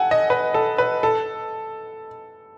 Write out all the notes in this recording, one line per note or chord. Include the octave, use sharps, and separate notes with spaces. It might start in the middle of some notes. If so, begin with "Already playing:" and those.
Already playing: A4 F#5 G#5
D#5
B4
A4
B4
A4